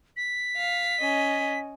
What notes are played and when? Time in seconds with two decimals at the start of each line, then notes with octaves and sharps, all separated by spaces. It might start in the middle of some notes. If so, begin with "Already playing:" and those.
0.17 B6
0.57 F5
1.01 C#4 D#5